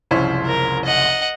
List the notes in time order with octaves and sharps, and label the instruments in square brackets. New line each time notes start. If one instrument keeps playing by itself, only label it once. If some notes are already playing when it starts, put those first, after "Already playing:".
[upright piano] F#1 C2 F3 [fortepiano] C#4 E4 C5
[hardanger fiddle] A#4
D#5 F#5